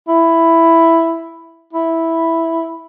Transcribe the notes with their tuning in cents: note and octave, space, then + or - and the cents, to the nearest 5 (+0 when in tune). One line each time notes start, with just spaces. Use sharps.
E4 +5
E4 -5